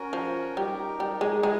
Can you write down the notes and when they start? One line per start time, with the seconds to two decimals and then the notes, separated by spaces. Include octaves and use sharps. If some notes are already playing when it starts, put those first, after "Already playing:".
Already playing: C#4 F#4 A#4
0.13 F3
0.57 G3 D#4 G4 A#4
1.00 G3
1.21 G#3
1.43 G#3 E4 G#4 B4